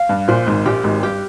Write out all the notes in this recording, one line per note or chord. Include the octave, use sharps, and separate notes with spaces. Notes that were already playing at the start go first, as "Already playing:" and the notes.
Already playing: F5
G2
A#1 A#2 C5
G#1 G#2
A#1 A#2 G4
G#1 G#2
G2 G4